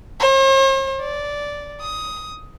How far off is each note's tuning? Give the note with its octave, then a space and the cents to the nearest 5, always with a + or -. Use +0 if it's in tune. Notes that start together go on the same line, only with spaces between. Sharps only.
C5 +45
D5 -10
D#6 +15